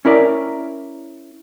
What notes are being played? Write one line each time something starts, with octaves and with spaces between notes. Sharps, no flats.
C#4 E4 A#4 D5